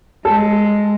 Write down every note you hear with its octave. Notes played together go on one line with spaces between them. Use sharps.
G#3 A4